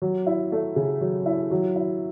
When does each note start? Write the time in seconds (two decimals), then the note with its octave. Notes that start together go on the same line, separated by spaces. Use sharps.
0.02 F#3
0.27 E4
0.52 A3
0.76 C#3
1.01 F#3
1.26 E4
1.51 F#3
1.76 E4